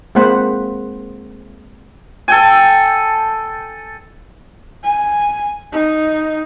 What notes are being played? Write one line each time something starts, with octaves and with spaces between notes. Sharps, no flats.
G#3 A#3 C4 C5 F#5 B5
A4 G5 G#5
G#5
D#4